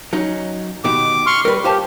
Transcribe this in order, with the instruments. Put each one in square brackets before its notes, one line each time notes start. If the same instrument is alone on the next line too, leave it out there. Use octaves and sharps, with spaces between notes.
[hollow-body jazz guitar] F#3 C#4 D#4
[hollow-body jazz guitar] B2 D#3 G4 [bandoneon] D6
[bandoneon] C6 C#6 F6
[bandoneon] G3 [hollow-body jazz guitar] A#4 B4
[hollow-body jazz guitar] F4 C5 A5 [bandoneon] G4